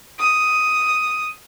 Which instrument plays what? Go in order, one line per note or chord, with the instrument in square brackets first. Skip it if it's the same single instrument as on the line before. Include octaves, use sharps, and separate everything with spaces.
[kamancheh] D#6